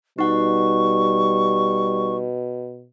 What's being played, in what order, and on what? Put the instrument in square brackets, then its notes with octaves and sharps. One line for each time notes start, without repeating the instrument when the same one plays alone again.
[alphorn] B2 [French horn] G3 [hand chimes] D#4 F#5 [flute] C#6